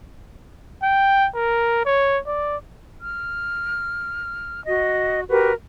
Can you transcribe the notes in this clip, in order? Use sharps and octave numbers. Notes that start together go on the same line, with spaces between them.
G5
A#4
C#5
D5
F6
F#4 D#5
F#4 G4 A#4 B4